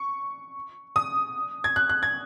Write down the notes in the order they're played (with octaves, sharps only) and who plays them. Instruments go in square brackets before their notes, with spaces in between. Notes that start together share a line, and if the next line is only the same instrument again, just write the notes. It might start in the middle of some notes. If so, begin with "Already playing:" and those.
Already playing: [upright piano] C#6
D#6
G#6
F#6
F#6
G#6